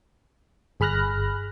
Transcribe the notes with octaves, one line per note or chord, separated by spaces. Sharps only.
G1 G#4 B5 F6 F#6 A#6